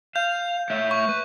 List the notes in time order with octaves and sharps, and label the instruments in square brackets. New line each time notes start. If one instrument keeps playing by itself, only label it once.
[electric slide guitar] F5 [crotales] G6
[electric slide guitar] A3 C#5 E5
[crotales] C#6
[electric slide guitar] B4